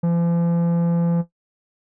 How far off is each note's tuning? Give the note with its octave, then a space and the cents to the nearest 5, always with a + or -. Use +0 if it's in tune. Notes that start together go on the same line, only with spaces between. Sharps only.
F3 -45